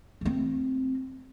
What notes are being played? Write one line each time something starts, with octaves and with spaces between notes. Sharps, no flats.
A3 C4